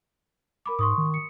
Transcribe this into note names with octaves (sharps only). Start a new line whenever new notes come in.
A#4 B5 D6
G#2 C6 C#6 D#6
D#3
C#7